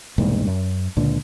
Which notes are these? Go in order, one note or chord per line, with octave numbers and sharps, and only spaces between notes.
E1 C2 G#2 A#3
F#2
C#2 A#2 D3